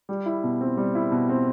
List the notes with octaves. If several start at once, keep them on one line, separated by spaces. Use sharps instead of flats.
G3
E4
B2
C4
G3
E4
B2
C4